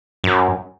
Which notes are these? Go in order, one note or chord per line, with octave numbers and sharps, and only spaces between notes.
F#2